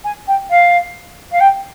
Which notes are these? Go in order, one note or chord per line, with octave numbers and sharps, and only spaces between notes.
G#5
G5
F5
F5
G5